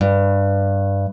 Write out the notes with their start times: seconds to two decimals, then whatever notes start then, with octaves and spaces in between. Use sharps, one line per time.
0.01 G2